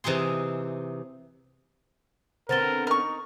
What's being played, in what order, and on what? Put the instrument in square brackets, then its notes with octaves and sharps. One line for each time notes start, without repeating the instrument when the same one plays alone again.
[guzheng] C3 E3 D#4 G#4 C6
[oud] D3 B3 C4 [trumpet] A#4 [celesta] C5 A6 G7
[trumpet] D#4 [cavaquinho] A#4 C#6